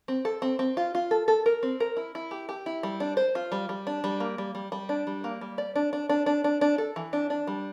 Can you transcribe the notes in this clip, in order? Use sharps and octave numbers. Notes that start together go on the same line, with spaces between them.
C4
A4
C4
C4
F4
F4
A4
A4
A#4
C4
A#4
E4
E4
G4
G4
E4
G3
D4
C5
F4
G3
G3
D4
G3
A#3
G3
G3
G3
D4
G3
A#3
G3
D5
D4
D4
D4
D4
D4
D4
A4
E3
D4
D4
G3